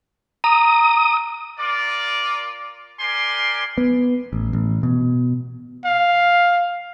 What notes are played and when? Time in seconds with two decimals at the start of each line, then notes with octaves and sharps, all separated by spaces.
0.44 A#5 D#6
1.59 F4 A#4 D5
3.00 G4 A#4 D5 G#5 C6
3.78 B3
4.33 A1
4.53 A1
4.83 B2
5.85 F5